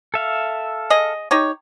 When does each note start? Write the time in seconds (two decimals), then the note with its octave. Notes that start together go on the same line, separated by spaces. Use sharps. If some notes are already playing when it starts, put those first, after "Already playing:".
0.14 A4 E5 F5
0.90 G#4 D#5
1.31 D#4 G4 C#5